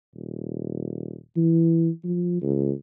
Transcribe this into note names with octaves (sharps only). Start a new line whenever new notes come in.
D#1
E3
F3
C#2